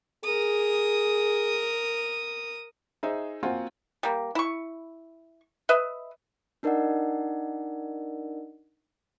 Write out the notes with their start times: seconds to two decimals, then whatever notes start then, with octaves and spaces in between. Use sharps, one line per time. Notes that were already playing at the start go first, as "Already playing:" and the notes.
0.24 G#4 A#4 D#6
3.03 D#4 G#4 C5 D#5 E5
3.43 A#3 C4 F4 F#4 F#5 G#5
4.03 G3 A#3
4.35 E4 C#6
5.69 B4 D#5 E5
6.63 D4 D#4 A#4 D5 D#5 F#5